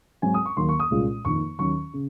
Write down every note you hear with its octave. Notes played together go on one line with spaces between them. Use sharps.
G#2 F#3 C4 G#5
D#6
C#6
D#2 D#3 F#3 A#3 C6
C#6
D#6
C2 A#2 G#3 C#4 F4
F2 D#3 A#3 D#4 C#6
D#2 D#3 F#3 C#4 C#6
C#3